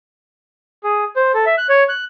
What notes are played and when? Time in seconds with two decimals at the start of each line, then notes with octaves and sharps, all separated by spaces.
0.84 G#4
1.16 C5
1.34 A4
1.46 E5
1.58 F#6
1.69 C#5
1.89 F#6